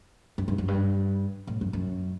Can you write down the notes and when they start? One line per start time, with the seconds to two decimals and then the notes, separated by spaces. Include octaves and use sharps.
0.38 F#2
0.48 G2
0.58 F#2
0.68 G2
1.47 A2
1.61 F#2
1.73 F#2